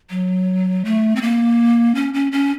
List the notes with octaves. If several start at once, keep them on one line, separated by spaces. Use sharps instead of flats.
F#3
A3
C4
A#3
C#4
C#4
C#4